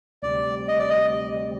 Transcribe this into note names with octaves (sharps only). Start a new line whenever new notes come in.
D2 C3 G3 D5
D#5
D5
D#5